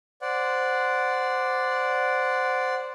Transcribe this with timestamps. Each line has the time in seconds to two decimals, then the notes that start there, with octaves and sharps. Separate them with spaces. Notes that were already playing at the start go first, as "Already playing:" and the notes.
0.22 C5 D5 F#5